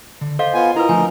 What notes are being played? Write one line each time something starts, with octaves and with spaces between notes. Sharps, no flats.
D3
A4 C5 D#5 F5
B3 F4 G#5
E4 F4 A#4 B4 D#5 A#5
D3 F3 A3 G#5